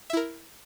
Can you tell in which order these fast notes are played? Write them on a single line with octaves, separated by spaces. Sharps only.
E5 E4 A#4